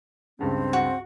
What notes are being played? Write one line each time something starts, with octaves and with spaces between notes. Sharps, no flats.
C#2 G2 C#3 C4
F#4